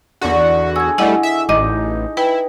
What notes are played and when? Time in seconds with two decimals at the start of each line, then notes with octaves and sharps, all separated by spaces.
0.21 E2 D3 F#4 C#6
0.76 G#4 E6 G#6
0.98 G3 A3 E4 D#5 F#5
1.23 E5
1.49 A1 D#4 D#5 D6
2.17 E4 B4 G5